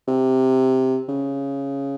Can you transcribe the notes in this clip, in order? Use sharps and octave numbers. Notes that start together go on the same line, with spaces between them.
C3
C#3